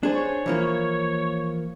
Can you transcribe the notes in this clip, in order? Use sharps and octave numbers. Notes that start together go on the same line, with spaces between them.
D4 G#4 C5
C#5
E3 F3 A#3